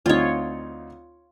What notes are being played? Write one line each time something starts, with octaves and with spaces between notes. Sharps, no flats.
D2 C4 D#4 F4 C#5